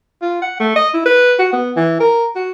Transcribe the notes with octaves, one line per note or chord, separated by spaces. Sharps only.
F4
F#5
A3
D#5
E4
B4
F#4
B3
E3
A#4
F#4